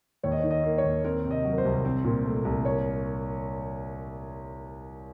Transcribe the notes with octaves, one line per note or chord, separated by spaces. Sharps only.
D#2 C#5
D#5
C#5
D#3
D#5
A#3
C#5
D#2
C4 A#4
C3
D#5
F#3
A#4
C5
C2
C4
A#2
A3
C2
A#3 C#5